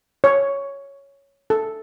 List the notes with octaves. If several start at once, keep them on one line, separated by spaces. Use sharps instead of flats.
C#5
A4